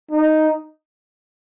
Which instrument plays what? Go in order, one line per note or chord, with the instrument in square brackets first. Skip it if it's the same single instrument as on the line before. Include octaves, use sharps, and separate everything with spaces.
[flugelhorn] D#4